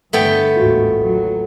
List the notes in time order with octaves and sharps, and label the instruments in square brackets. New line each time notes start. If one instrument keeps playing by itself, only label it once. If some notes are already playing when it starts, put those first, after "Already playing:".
[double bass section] G2 D3 [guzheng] A3 B3 G5
[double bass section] A1 D#2 G#2 [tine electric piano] F4 F#4
[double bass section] F#3